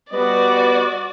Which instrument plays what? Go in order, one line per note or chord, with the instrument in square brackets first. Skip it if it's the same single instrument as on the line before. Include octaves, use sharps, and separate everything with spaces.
[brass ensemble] G3 B3 [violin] F#4 D5 [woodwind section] B4 D#5